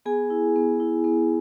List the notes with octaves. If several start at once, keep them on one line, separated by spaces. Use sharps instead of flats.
B3 G#4 G#5
E4
B3
E4
B3